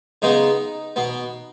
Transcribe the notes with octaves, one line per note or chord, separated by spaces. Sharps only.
C#3 G#3 B3 D#4
B2 B3